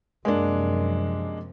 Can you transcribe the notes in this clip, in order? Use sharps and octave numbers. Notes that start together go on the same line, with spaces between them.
F#2 C3 F3 G#3 A#3 D4